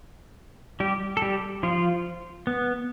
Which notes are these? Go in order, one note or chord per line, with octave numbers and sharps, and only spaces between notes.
G3 G4
A4
G3 G4
F3 F4
B3